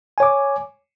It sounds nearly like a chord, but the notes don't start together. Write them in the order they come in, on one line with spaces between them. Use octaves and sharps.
G#5 C#5 D6